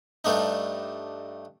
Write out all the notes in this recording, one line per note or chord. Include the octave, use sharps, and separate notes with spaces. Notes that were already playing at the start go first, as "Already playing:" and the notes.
G2 G3 A3 D4 D#4